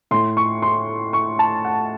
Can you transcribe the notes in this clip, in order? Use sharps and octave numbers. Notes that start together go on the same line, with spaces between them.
A2 C6
C#6
C6
C#6
A5
F#5